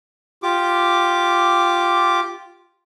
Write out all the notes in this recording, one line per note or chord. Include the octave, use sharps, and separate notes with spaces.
F4 G4 D6